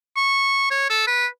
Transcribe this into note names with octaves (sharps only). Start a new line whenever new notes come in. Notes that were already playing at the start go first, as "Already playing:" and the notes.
C#6
C#5
A4
B4